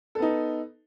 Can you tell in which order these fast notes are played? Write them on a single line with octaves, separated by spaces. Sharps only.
A4 B3 D#4